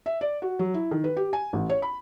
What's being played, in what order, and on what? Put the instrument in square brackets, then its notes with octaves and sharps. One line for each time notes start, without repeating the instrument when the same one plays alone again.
[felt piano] E5
D5
F#4
F#3
E4
D#3
B4
G4
G#5
A1
C#5
B5